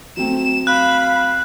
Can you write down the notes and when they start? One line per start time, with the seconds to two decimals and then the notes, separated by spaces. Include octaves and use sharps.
0.17 F#3 A3 C4 E7
0.67 F5 B5 F#6